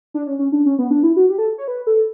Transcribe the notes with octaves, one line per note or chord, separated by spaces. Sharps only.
D4
C#4
C#4
D4
C#4
B3
D4
E4
F#4
G4
A4
C#5
B4
A4